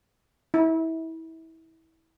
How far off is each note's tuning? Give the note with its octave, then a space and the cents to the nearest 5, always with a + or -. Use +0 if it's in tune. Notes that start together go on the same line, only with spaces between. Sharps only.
E4 -25